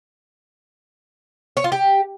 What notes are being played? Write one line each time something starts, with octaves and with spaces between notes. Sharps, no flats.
C#5
F4
G4